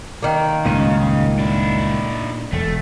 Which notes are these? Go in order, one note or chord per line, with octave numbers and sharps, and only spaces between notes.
D#3 A#3
C#2 G2 A#2 C#3 D#4
D4 E4
E1 A3